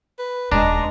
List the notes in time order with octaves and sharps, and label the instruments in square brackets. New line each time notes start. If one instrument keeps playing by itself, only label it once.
[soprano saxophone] B4
[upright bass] D#1 D#4 [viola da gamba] G#3 [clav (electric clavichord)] D4 [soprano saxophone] A#5